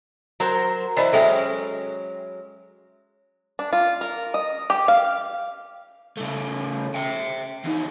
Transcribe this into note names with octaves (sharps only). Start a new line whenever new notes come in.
F#3 A#4 C5
E3 E4 C5 D5 D#5
F#3 G#3 C#4 A4 E5 G5
D4
F4
A#4
D#5
G4
F5
C#3 A3
E5 G5
E2 D#4